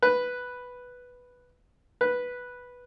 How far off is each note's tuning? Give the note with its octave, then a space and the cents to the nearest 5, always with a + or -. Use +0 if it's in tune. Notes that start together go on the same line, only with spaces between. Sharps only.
B4 +0
B4 -5